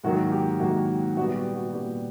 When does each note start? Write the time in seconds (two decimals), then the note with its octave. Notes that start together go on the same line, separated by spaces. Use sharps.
0.04 G#2 D#3 F#3 A#3 F#4
0.32 G4
0.60 G#2 D#3 F#3 A#3 F#4
1.17 A#2 G3 B3 F#4
1.36 G4
1.54 F#4
1.73 A#2 G3 B3 G4